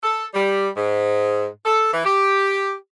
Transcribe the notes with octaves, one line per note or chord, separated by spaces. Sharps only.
A4
G3
G#2
A4
E3
G4